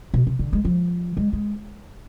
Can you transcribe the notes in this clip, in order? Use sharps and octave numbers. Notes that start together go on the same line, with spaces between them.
B2
C3
D3
G#3
F3
G#3
G#3